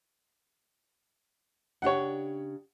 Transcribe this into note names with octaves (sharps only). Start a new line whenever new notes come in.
C#3 D4 G4 C#5 F#5